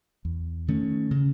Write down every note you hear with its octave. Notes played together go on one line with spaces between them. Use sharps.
E2
D#3 A3 C#4
C#3